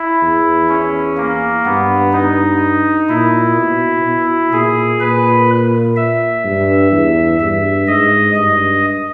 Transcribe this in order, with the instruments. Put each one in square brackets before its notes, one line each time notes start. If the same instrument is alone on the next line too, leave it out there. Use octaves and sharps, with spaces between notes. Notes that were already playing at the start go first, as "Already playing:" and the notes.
Already playing: [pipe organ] E4
[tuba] E2
[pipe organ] C#4
A#3
[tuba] G2 [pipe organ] B3
[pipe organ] D#4
[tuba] A#2 [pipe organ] E4
[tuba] B2
B2
[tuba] A#2 [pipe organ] G#4
[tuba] A#2 [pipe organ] B4
[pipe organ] E5
[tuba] G2
E2
[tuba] G2 [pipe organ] E5
[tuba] G#2 [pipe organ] D#5
[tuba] G2 [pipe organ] D#5